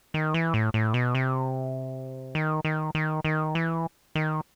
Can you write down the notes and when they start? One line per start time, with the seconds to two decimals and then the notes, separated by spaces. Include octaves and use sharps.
0.14 D#3
0.34 E3
0.54 A2
0.74 A2
0.94 B2
1.15 C3
2.35 D#3
2.65 D#3
2.95 D#3
3.24 D#3
3.55 E3
4.15 D#3